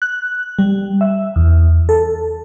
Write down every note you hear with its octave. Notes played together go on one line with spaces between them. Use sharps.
F#6
G3
E5
E2
A4